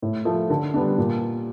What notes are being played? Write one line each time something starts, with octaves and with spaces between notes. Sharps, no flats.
A2
F3 A3
D3
G3 B3 D4
A#2